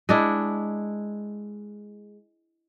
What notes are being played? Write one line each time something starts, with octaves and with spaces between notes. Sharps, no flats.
G#3 D4 E4